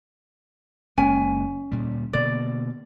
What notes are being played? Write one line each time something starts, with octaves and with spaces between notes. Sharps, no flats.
F#1 G#3 A#3 C#4 G#5
D2 A#2 G3
B2 D3 A#3 D5